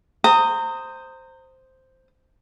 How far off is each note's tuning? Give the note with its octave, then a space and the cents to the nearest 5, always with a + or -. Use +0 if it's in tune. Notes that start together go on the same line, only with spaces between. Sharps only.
C5 +0 A#5 -30 D#6 +0